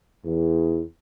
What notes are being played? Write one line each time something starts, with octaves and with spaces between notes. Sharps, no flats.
E2